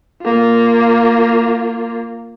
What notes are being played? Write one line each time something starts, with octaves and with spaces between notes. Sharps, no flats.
A#3 F4